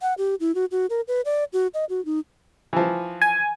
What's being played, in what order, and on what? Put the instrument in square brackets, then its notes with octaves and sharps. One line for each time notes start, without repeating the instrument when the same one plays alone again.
[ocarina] F#5
G4
E4
F#4
F#4
A#4
B4
D5
F#4
D#5
F#4
D#4
[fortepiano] E3 F3
[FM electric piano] G#5